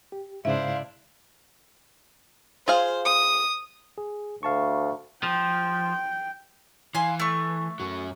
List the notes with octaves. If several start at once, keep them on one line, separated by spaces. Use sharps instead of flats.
G4
G#2 C#3 D4 E4 C5 E5 F5
F4 G#4 C5 F5
D#6
G#4
D2 F5 A5 C#6
F3 G5
E3 F5 G#5 C6
A3 C#6
F#2 F#3